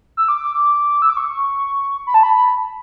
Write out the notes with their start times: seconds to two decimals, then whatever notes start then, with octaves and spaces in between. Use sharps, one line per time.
0.17 E6
0.29 D6
1.02 E6
1.09 D6
1.17 C#6
2.07 B5
2.14 A5
2.23 B5